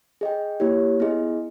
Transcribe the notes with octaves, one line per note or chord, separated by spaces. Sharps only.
G#4 D#5 G5
A#3 E4 G4 C#5
B3 E4 G#4 D#5